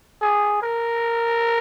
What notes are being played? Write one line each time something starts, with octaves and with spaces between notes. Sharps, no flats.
G#4
A#4